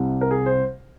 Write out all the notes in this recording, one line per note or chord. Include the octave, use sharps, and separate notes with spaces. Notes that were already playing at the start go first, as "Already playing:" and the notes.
Already playing: C2 C3 G3
A#4
G#4
C5